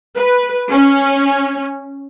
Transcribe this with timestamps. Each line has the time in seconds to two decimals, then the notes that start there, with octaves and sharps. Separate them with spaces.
0.16 B4
0.72 C#4